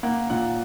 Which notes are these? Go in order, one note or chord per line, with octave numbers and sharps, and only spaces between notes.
A#3 F#5
A#2 F#5